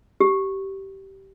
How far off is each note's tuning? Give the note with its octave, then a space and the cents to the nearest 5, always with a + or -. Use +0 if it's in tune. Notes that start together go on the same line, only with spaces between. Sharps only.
G4 -20